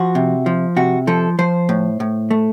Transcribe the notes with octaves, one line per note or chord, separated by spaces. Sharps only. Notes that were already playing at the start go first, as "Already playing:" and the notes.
Already playing: F3 F#4
C3
F3
C3 F#4
F3 A4
F3 C5
A2
A2
A3